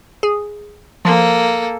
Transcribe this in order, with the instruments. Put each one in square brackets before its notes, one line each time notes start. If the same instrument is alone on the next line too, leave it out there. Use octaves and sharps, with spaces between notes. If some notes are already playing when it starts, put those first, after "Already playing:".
[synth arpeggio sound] G#4
[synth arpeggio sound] F3 [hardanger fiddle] A#3 A4